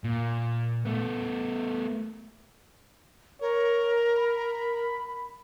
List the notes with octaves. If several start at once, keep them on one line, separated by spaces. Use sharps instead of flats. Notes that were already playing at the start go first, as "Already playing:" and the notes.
A#2
A3 B3
A#4 C#5
B5